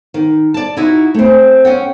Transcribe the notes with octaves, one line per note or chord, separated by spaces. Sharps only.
D#3
D5 A5
D#4 E4 F#4
A3 C4
C#4 F#5 G5